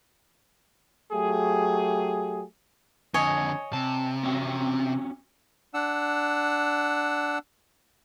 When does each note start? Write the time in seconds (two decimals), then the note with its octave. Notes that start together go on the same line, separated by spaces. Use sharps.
1.12 F#3 A3 G4 G#4
3.14 F2 D3 C#5 D#5 G#5
3.73 C3 A5
4.23 C4 C#4 F#4
5.74 D4 F#5 E6